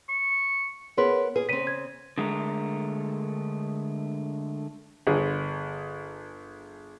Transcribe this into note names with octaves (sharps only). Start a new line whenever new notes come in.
C#6
B3 G#4 A#4 B4 C#5 C6
G#4 B4
C#3 C4 B6 D#7
G#6
D3 G#3 A3 A#4
G1 G#4